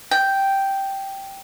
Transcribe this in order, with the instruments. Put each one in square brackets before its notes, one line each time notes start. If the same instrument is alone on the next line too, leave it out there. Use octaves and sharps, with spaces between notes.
[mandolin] G5